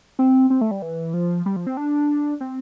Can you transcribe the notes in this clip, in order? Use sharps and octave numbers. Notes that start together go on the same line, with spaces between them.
C4
C4
A3
G3
E3
F3
G3
F3
C4
D4
C4